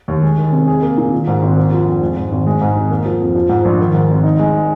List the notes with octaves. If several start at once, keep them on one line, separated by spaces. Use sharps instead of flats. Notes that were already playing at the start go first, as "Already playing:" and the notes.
D#2
G#3
D#3
C3
G#4
A#3
A#2
D#3
G#2
G#1
A#3
F3
F2
G#3
G#2
G#1
G#3
G#2
G#1
A#3
F3
F2
F3
G#2
A#1
D#3
G#2
G#1
D#4
G#3